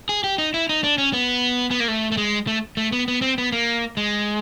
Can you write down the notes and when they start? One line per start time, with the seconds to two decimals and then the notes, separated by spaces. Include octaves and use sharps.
0.09 G#4
0.24 G4
0.38 D#4
0.54 E4
0.69 D#4
0.84 D4
0.98 C#4
1.13 B3
1.71 B3
1.80 A#3
1.88 A3
2.12 A3
2.17 G#3
2.47 A3
2.77 A3
2.92 B3
3.08 B3
3.22 C4
3.38 B3
3.52 A#3
3.97 G#3